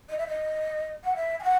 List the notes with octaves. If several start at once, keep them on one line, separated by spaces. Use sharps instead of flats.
D#5
E5
D#5
F#5
E5
G#5
F#5